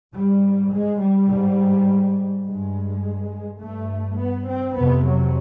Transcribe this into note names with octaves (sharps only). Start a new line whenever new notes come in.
G#2 G3
G#3
G3
G#2
G2 G#3
G2 A3
B3
C4
F2 C3 B3
F#3